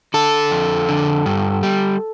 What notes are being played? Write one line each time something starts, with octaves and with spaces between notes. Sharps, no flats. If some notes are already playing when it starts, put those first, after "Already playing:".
D3 A4
F2
D3
G2
G3